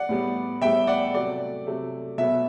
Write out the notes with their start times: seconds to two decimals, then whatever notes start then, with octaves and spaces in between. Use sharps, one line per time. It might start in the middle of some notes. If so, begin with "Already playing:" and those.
Already playing: D5 F#5
0.09 A2 G3 B3
0.61 A2 G3 B3 E5 G5
0.87 D5 F#5
1.14 C3 F#3 A3 D5
1.67 C3 F#3 A3
2.18 B2 F#3 B3 E5